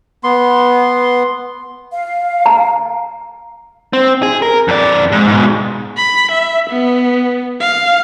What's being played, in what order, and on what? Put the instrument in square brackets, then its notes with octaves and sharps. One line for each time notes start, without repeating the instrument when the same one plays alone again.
[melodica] B3 C6
[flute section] F5
[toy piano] A#5
[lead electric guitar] C4
G#4
A#4
F2 D5
G#2
G#2 B2
[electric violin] B5
E5
B3
F5